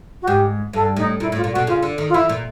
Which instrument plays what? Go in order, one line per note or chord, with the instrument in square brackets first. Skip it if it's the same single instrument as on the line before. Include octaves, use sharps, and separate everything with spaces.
[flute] F#4
[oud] G#2 [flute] G4
[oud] G2 [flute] A4
[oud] A2 [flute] D#4
[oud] A#2 [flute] E4
[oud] A2
[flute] F4
[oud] A#2
[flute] F#4
[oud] B2
[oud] C#3 [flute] F4
[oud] D3
D#3
[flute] F4
[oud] E3 [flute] E4
[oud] A#2